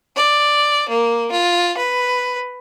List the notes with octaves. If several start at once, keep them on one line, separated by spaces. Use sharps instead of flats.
D5
A#3
F4
B4